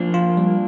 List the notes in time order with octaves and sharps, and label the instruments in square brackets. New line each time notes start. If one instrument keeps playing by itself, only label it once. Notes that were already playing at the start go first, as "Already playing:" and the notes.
Already playing: [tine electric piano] F3 [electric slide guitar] A#3 D4
[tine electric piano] F4
G3